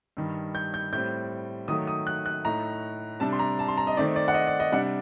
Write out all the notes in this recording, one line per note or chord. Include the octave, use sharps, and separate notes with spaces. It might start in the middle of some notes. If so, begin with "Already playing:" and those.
G2 D#3 G3
G6
G6
A2 G3 C4 G6
D#3 F#3 A3 D#6
D#6
F#6
F#6
A2 A3 D#4 A#5
C3 G3 D4 A5
C6
A#5
A5
C6
A#5
D#5
D#3 A3 C4 D#4 D5
D5
F#5
D#5
D5
D#5
C3 G3 D4 F#5